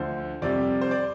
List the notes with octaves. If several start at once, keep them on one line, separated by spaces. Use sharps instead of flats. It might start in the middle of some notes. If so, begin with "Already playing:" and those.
Already playing: D2 D3 F3 C5
F2 C3 G3 D5
C5
D5